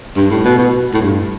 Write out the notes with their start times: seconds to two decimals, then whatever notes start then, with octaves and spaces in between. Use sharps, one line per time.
0.17 G2
0.30 A2
0.45 B2
0.58 B2
0.94 A2
1.01 G2